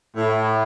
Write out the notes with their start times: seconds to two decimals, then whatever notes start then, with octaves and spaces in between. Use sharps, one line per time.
0.17 A2